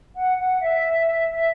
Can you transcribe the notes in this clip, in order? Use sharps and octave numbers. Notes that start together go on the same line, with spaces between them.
F#5
F#5
E5
E5